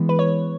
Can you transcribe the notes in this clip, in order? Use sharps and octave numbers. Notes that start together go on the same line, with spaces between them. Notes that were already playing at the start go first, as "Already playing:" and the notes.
Already playing: E3 G#3 B3
B4
C#5